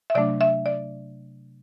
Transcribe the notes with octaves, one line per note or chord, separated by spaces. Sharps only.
E5
C3 F#3 A3 D4 D5
E5
D5